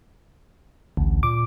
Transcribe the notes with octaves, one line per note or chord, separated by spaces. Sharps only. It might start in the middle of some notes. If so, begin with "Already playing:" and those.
A1 D2
A#2 D6